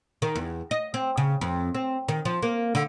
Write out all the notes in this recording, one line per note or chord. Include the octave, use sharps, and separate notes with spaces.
D#3
E2
D#5
C4
C#3
F2
C4
D#3
F3
A#3
D3